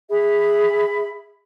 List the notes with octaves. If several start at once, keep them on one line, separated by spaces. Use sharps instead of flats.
G#4 E5 B5